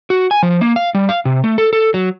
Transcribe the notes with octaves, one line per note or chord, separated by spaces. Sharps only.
F#4
G#5
F3
A#3
F5
G3
F5
C3
A3
A4
A4
F#3